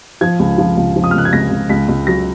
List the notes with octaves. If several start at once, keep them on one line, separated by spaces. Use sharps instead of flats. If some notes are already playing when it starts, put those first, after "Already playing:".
F3 G#6
C#2
F3
C#2
F3
D#6
F6
C#2 F#6
G#6
C#2 A#6
C#2
C#2 B6
C#2
F#3 A#6